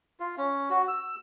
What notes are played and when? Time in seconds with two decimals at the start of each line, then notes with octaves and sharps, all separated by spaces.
0.20 F4
0.38 C#4
0.70 F#4
0.88 E6